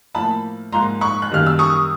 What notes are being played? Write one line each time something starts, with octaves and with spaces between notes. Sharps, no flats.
A2 F3 A#3 A5 B5
G#2 F3 A#3 A#5 C6
B5 C#6
F#6
F#2 D#3 G3 A#3 F6
E6
C#6 D#6